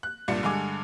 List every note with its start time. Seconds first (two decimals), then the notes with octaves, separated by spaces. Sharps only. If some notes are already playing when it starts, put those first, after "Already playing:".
0.03 F#6
0.28 C2 G2 A#2 D5 C#7
0.43 G2 D3 G#3 G#5 D6